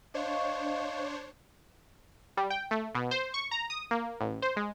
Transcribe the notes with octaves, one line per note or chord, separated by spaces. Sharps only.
D4 C5 C#5 D#5 F5 C#6
G3
G5
A3
B2
C5
C#6
A#5
D#6
A#3
A1
C5
G#3